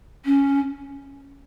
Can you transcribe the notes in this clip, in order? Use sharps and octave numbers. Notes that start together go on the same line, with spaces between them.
C#4